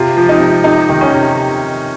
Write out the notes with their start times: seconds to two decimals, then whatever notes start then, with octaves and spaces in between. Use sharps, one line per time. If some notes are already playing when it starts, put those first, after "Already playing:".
Already playing: C3 F4
0.17 F3
0.29 D#4
0.40 C3
0.64 C3 D#4
0.89 D#3
1.01 C#4
1.13 C3